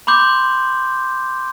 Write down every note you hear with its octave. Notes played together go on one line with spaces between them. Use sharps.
B5 C6 D6 G6